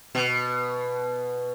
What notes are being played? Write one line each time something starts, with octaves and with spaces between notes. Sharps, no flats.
B2